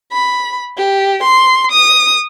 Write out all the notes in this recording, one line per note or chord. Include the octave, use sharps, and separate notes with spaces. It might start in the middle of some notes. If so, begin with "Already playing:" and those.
B5
G4
C6
D#6